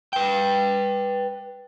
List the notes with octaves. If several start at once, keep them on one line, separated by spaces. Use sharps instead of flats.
B4 G5